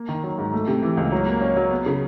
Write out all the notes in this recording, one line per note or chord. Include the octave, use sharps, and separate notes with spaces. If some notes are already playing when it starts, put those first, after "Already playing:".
Already playing: A#3
D#3
F#3
G#2
A3
C3
E3
C#2
F#3
A#3
C#4
F#3
B3
C#3